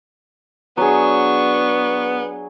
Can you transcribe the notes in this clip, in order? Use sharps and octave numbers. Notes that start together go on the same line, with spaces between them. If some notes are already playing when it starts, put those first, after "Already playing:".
F#3 B3 D4 G#4 C#6